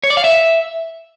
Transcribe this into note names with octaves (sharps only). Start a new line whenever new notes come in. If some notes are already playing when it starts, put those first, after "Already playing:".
C#5
D5
F5
E5